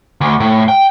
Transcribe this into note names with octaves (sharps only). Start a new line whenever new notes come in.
D2
A2
G5